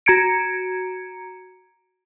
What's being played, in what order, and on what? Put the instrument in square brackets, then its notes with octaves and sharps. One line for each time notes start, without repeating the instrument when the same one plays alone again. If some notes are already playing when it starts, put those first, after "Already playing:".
[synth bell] F#4 A#5 G#6 C#7 D7